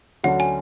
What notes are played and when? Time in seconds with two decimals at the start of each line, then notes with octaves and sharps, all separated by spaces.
0.23 D2 D3 F#3 C#4 F#4 F#5
0.40 G#5